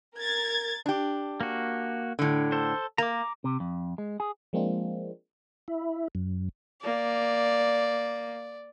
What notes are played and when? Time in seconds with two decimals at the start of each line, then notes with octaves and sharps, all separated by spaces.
0.16 A#4 G#6 A6
0.86 D4 G4
1.41 A#3 F#4
2.19 A2 D3
2.52 A4 C5
2.98 A#3 A#5 D6
3.44 C3
3.60 F2
3.98 G#3
4.20 G#4
4.53 F3 G#3 A#3 C4 D4 F4
5.68 E4
6.15 F#2
6.83 A#3 D5